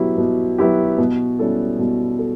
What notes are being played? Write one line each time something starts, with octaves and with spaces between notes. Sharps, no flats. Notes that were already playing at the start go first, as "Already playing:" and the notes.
Already playing: B2 F#3 B3 E4 G4
B2
F#3 B3 E4 G4
B2
G3 C#4 E4 A4
B2
A4